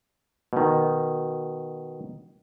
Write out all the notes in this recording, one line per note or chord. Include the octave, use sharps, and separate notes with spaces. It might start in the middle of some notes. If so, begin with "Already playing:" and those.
B2 D#3